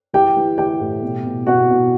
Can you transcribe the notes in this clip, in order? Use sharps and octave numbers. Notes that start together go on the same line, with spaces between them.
E3 G4 G5
E3
E3 G4 G5
A2
B2
B2
B2 F#4 F#5
B2